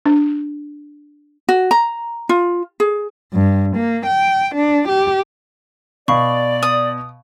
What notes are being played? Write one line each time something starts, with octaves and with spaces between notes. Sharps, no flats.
D4
F#4
A#5
F4
G#4
G2
A#3
G5
D4
G4
B2 D5 F5 B5 C#6
D#6